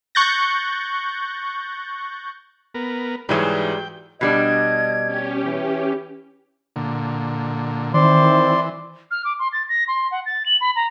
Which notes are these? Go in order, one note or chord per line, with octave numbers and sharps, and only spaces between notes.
C#6 F#6 G6 A6 A#6
B3 A#4
G#2 E3 F#3 G3 G#4 G5
B2 G3 D4 D#5 G#6
C#4 G4
E3
A#2 D3
D#3 E3 C4 E4 C5 D5 C6
F6
D6
C6
A6
A#6
C6
F#5
A6
F#7
B5
A#5